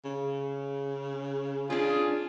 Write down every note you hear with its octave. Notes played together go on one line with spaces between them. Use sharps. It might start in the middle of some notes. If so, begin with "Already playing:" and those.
C#3
C#4 D4 F4 G#4